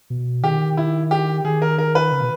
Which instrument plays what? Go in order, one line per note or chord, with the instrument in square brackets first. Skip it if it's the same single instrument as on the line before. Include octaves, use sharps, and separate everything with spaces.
[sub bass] B2
[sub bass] D#3 [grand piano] G4
[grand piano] E4
G4
[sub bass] D#3 [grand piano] G#4
[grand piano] A#4
A#4
B4
[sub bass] C#3
B2